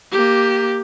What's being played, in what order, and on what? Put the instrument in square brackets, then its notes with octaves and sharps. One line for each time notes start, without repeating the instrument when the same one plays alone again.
[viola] A#3 G4